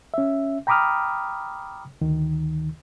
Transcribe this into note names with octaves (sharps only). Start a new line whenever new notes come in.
C#4 E5
G5 A#5 B5 D6 D#6 F6
D2 D#3